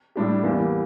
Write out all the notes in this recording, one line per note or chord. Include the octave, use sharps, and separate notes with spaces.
A2 G3 D4 G4
E2 E3 G3 A#3